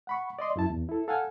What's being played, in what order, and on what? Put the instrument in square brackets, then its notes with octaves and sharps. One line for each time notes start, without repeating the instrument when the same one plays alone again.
[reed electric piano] F#5 B5 C#6
D5 D#5 C6
F#2 E4 A5
E2
E4 A4
A4 F5 F#5 G#5